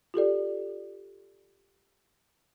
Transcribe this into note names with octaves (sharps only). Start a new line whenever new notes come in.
F4 G4 A4 D5